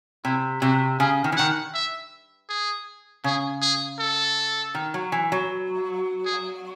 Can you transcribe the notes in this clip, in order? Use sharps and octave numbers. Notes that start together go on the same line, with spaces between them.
C3 E4
C3 F#4
C#3 G#4
D#3
E3
D#3 F#5
E5
G#4
C#3 G#4
G#4
A4
D#3
F#3
E3
F#3
G#4